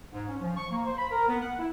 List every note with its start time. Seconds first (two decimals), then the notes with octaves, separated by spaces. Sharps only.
0.13 G#2
0.28 C#4
0.40 F3
0.57 C#6
0.71 A#3
0.86 C5
0.98 B5
1.12 A#4
1.28 B3
1.41 F#5
1.59 E4